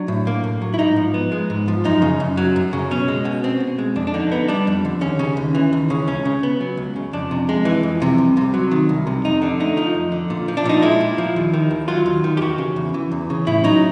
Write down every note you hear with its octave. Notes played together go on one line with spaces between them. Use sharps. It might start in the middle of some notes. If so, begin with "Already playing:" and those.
Already playing: F#3 D4
A2
A#3
A2
F#3
E4
G#2 D#4
F3
B3
G#3
G#2
F3
F#2 D#4
C#3
F#2
F#3
F#2
C#3
B2 C#4
G#3
B2
C4
B2
G#3
F2 D4
D4
D3 D#4
B3 D#4
G3 D4
F2
D3
D#2 C#4
C#3
D#2
E3
D#2
C#3
C#2 C#4
C#3
B3
F#3
C#2
C#3
F2 D4
C3
G#3
E3
F2
C3
C2
C3
F#3
D#3
C2
C3
F2 D#4
D3 D4
A3 D#4
F3 D#4
F2
D3
A#2
F3
D4
A#2 D#4
G#3 E4
A#2
F3
D#2
D#3
D#2
F#3 F4
D#2
D#3
G4
E2 F#4
C#3
E2
E3
E2
C#3
A2 E4
F#3 D#4